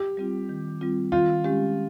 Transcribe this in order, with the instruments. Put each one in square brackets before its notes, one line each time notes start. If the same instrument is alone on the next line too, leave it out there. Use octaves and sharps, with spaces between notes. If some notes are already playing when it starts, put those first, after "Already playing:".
Already playing: [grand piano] G4
[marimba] G3 C4 F4
D#3
G3 C4 F4
[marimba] D#3 [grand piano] F4
[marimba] G#3 C#4 G4